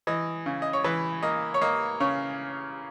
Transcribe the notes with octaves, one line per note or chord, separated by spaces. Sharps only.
E3 D#5
C#3
D#5
C#5
E3 B4
A#3 D#5
C#5
A#3 D#5
C#3 C#5